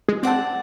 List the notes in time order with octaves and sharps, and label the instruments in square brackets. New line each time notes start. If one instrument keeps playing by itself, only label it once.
[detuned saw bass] G#3
[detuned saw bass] C4 [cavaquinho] D5 F#5 A5